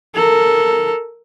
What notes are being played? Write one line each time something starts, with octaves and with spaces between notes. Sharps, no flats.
A4 A#4